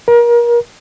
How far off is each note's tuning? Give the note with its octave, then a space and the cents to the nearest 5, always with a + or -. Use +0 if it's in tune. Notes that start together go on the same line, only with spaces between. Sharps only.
A#4 +30